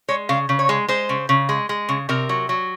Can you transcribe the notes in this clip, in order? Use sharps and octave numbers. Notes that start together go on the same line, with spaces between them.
G#3 C#5
C#3 F5
C#3
C#5
G#3
G#3 C5
C#3
C#3
G#3
G#3
C#3
C3 A#4
F#3
F#3